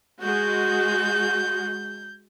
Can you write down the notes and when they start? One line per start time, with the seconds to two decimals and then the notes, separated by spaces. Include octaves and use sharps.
0.23 G#3 F#4 G6